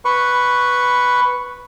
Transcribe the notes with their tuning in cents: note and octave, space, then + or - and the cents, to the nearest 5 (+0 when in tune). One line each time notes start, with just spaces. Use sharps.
B4 +0 C#6 +0